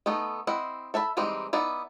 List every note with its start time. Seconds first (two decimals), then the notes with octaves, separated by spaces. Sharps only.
0.06 A3 B3 D#4 A4
0.47 C4 E4 D#5 F#5
0.94 A4 E5 A5 B5
1.17 E3 G3 G#3 C4 D#4
1.53 B3 D#4 E4 D5